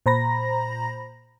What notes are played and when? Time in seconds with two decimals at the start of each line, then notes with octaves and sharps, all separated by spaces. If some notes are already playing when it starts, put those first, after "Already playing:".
0.06 A#2 C5 A#5 B5 A#6